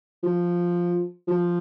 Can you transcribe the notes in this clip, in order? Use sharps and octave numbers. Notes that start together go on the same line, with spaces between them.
F3
F3